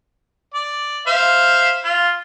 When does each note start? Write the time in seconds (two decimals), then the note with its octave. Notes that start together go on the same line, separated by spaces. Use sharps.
0.54 D5
1.07 C5 E5 F5
1.84 F4